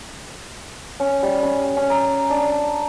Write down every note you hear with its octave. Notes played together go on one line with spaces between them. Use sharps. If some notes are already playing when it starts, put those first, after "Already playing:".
C#4
G3
C#4
C#4
A#5
D4